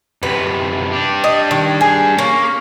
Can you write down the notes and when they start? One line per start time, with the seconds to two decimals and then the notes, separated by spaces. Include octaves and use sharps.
0.23 F#2 C3 B4
0.93 D4 G4
1.24 D#5
1.51 D#3
1.81 G#4
2.19 A#3 C#4